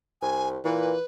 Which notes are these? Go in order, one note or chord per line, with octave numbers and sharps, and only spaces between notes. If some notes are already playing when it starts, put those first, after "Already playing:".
C2 G#5
A#2 E3 B4